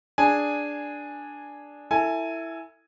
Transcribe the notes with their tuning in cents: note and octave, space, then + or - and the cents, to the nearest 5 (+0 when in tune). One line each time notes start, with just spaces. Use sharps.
D4 +0 G#4 +0 G#5 -5
E4 +0 A4 +25 G#5 +0